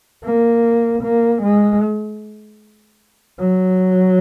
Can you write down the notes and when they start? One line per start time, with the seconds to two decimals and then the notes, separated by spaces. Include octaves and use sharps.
0.24 A#3
1.03 A#3
1.42 G#3
3.39 F#3